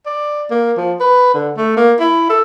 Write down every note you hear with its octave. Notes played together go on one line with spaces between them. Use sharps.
D5
A#3
F3
B4
D3
A3
A#3
E4
A4